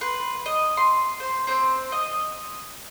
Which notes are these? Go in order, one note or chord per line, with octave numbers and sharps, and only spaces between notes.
B4 C6
D#5
C6
C5
C4 C5
D#5